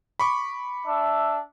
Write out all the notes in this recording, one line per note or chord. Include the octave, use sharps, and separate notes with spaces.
B5 C#6 D6
D4 E5